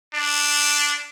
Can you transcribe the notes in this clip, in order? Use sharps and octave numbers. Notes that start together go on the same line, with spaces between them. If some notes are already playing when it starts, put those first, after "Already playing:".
D4